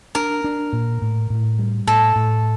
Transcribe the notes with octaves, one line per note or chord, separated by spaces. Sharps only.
D4 A#4
D4
A#2
A2
A2
G3
A2 A4
A2